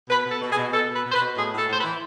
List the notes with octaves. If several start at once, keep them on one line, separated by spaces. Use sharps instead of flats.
B2 B4
B2 A4
B2
G#4
B2
B2 A4
B2
B4
B2 C5
B4
B2
A2 G#4
A2 A4
A2 C5
B4
E3